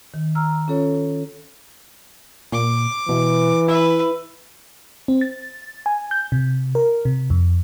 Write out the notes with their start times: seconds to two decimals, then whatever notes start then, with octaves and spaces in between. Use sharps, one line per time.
0.14 D#3
0.35 A#5 E6 F6
0.68 C#4 F4 A4 C#5
2.52 A#2 D6
3.09 B2 E3
3.68 E4 B4 E5
5.08 C4
5.21 A6
5.86 G#5
6.11 G6
6.32 C3
6.75 A#4
7.05 C3
7.30 F2